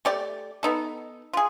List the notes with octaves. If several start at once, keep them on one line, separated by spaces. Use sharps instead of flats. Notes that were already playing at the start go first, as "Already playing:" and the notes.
A3 G4 D5
B3 D#4 A4
F4 G#4